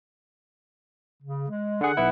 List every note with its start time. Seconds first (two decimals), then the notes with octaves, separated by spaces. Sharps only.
1.22 C#3
1.49 G#3
1.81 D3 G#4 F#5
1.97 B1 B3 E4